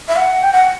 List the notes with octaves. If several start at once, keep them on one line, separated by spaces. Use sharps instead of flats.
E5
F#5
G5
F#5